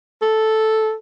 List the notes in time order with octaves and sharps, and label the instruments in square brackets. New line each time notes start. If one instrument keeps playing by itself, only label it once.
[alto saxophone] A4